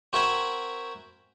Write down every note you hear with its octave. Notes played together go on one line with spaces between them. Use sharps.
C4 F#4 A#4 E5 G#5 B5